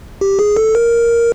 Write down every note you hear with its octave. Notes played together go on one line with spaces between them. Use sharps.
G4
G#4
A4
A#4